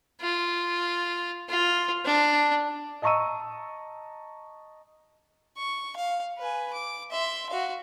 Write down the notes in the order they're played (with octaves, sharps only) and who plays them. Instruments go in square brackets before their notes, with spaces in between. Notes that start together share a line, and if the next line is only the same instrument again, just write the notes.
[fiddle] F4
F4
D4
[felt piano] D#5 A5 A#5 C#6 E6 D#7
[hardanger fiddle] C#6
F5
B4 G#5
D6
E5 C6
F#4 F5